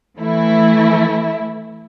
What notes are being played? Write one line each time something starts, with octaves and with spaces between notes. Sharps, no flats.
E3 A3 E4